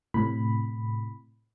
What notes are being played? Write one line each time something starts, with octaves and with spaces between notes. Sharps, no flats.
A2 C3 B5